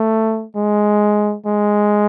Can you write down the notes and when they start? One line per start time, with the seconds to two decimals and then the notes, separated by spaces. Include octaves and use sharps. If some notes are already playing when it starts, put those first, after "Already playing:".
Already playing: A3
0.55 G#3
1.45 G#3